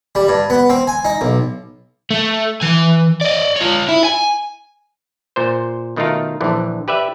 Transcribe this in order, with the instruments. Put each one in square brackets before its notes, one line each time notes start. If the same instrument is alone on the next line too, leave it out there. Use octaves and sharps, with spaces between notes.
[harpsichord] G3
G2
B3
C4
G#5
D#4
B1
[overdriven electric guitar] A3
E3 G#5
D5 D#5
F4 C#5
E4
G#5
[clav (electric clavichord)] A#2 C5
B2 D#3 A3 D#4 F4 A#4
A#1 D3 E3
G4 B4 D5 E5